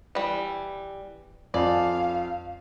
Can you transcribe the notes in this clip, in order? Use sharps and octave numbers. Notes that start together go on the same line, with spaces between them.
E3 G3
F2 D5 F5 G#5